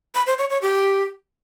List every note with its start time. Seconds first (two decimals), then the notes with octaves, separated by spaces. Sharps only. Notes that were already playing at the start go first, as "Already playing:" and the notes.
0.15 B5
0.27 C5
0.38 C#5
0.50 C#5
0.62 G4